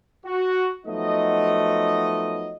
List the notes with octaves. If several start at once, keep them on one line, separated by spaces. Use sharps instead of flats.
F#4
F3 F#3 A3 B3 D#4 D#5